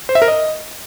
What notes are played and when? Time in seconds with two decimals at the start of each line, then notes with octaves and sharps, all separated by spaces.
0.09 C5
0.15 E5
0.22 A#4
0.28 D#5